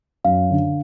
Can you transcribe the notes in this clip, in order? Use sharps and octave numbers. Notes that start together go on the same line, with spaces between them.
F#2 F5
D3